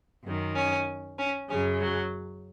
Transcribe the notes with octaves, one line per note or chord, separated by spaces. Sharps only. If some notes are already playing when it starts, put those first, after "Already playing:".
F#2 D#3
C#4
C#4
F#2 C#3 C#4
F#3